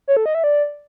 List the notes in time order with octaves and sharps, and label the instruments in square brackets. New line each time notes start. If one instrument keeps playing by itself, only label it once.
[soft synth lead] C#5
A4
D#5
E5
D5